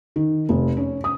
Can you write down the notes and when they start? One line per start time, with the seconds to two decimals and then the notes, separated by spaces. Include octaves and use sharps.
0.16 D#3
0.49 F1
0.77 C#4
1.04 D#6